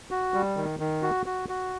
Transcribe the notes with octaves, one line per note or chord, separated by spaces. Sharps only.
F#4
G3
D#3
D#3
F#4
F#4
F#4